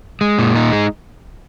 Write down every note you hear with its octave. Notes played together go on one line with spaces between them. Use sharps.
G#3
A#2
D#4
G#3